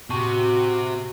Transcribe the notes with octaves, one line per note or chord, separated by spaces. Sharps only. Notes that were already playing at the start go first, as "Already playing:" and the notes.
A2 C3 F#4 C#6